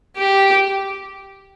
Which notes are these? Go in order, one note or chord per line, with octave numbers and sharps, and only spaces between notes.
G4